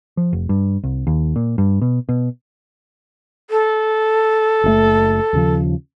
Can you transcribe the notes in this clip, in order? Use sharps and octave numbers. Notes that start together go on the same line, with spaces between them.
F3
F1
G2
C2
D#2
A#2
G2
B2
B2
A4
F#1 C#3 A3
D#2 C#3 F3